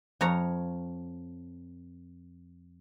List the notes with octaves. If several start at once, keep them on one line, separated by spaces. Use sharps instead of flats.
F2 C#5 A#5